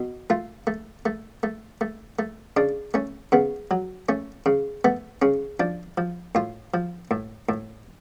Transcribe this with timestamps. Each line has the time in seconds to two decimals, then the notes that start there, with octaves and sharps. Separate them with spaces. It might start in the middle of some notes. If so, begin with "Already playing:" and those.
Already playing: B2
0.30 A3 F4
0.67 A3
1.06 A3
1.43 A3
1.81 A3
2.19 A3
2.57 C#3 D4
2.94 A3 C#4
3.32 C#3 B3
3.71 F#3
4.09 A3 C#4
4.46 C#3
4.85 A3 B3
5.22 C#3 C#4
5.60 F3 D4
5.98 F3
6.35 A2 F4
6.74 F3
7.11 A2
7.49 A2